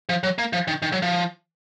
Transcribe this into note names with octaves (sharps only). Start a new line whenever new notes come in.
F3
F#3
A#3
F3
D#3
D#3
F#3
F3